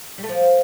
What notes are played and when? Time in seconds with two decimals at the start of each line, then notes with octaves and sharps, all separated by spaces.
0.18 G3
0.23 A3
0.29 F3